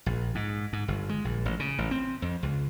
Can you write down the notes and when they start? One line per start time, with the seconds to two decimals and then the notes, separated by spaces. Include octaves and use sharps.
0.06 A#1
0.35 G#2
0.73 G#2
0.88 G1
1.09 G#3
1.25 A#1
1.45 A1
1.59 C#3
1.78 A1
1.91 C4
2.22 F2
2.43 C#2